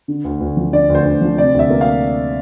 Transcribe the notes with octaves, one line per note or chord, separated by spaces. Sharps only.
D3
D2
D2
F3
D3 D5
D2
C5
D2
F3
C3 D5
D2 E5
A#3
F5